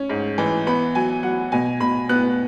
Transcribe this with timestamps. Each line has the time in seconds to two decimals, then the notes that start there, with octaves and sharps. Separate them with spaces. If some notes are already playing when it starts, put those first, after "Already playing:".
Already playing: C#4
0.09 G#2
0.38 E3
0.67 B3 B5
0.95 F#3 G#5
1.23 F#3 F#5
1.52 B2 G#5
1.80 B2 B5
2.09 B3 F#6